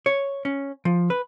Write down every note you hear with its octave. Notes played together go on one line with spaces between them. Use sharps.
C#5
C#4
F3
B4